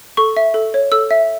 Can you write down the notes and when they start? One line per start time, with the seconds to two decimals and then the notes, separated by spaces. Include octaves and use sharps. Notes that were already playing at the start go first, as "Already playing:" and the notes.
0.17 A4 C#6
0.36 E5
0.54 A4
0.74 C#5
0.92 A4 E6
1.11 E5